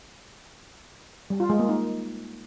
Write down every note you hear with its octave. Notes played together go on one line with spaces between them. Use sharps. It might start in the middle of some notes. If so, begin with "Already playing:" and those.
G3
F4
G#3
A#3
D#4